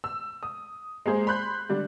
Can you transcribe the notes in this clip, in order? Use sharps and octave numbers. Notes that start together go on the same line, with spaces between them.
E6
D#6
G#3 A#3 G#4 C5
B5 C6 F#6 G6
D3 G3 D4